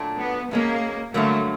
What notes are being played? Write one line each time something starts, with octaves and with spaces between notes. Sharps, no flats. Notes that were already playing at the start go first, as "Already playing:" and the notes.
Already playing: A#2 F#3 A3 D4
B3
B2 G#3 A#3 C#4
G2 D3 F#3 A3 A#3